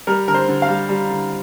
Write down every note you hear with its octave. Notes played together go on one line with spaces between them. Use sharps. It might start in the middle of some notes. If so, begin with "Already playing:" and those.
G3 A#4
D3 A#4
C5
D3
F5
G3
G3
D3